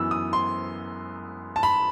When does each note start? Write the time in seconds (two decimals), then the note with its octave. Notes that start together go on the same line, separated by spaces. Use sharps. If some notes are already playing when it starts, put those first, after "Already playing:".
Already playing: F#2 E3 B3 E6
0.11 D#6
0.33 C6
1.56 A5
1.63 B5